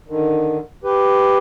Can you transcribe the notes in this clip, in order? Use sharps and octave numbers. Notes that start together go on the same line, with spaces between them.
D3 D#3
G4 B4